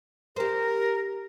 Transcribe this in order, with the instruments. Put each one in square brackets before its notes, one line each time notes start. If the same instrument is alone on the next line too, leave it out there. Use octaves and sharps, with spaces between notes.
[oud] G4 C5 [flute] A#4